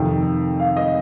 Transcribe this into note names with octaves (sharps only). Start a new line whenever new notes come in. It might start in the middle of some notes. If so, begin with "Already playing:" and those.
Already playing: F2 C3 D#3 G5
F5
D#5